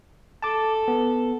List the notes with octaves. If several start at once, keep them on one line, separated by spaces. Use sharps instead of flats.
A4 A5 D6
B3